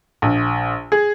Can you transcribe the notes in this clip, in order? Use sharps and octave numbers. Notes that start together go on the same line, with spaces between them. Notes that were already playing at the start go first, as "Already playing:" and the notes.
A#1
G#4